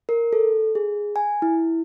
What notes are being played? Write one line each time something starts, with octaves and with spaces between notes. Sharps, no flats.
A#4
A4
G#4
G#5
E4